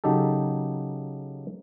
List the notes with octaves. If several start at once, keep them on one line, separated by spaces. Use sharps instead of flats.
C#3 F#3 D#4 G4 A4